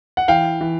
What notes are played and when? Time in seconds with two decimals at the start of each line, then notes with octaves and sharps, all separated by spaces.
0.17 F#5
0.28 E3 F5 G5
0.61 E3